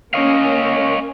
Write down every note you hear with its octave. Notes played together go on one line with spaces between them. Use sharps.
A#3 C#4 C#5 D#5 F5